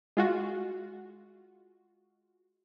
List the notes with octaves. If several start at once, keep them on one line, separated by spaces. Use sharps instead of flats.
G#3 F4 F#4